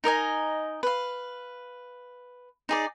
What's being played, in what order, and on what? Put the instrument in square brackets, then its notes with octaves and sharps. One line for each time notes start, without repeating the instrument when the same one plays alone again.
[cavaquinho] D#4 A#4 D#5 G#5
B4 F5
D#4 G#4 D5